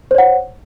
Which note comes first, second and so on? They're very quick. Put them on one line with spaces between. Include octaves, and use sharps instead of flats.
C5 C#5 F#5